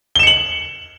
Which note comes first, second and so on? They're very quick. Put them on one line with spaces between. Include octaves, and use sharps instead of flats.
G7 E7 C#7 F#7